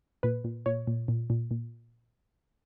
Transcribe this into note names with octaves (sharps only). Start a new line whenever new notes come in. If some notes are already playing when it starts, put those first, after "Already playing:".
A#2 B4
A#2
A#2 C#5
A#2
A#2
A#2
A#2